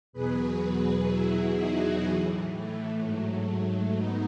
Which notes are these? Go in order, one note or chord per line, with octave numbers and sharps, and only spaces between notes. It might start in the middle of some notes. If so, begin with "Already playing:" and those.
E2 B2 F#3 G#4 B4
E2 B2 F#3 E4 G#4
D#4 F#4
A2 E3
A3
G#2 F#3 A3
A3
G#2 B3 D#4